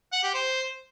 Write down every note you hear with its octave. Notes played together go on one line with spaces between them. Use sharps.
F#5
G4
C5